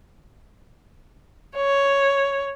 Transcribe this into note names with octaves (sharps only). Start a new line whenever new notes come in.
C#5